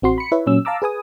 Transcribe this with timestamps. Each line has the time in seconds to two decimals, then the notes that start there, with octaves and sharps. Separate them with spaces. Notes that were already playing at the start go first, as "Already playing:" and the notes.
0.02 A1 C4 F#4 C6
0.18 B5 C#7
0.32 E4 B4 C#5 E5
0.46 A#2 F#3 C#4 E6
0.65 F5 A5 A#5 D6 E6
0.82 G#4 B4 G#5 D#6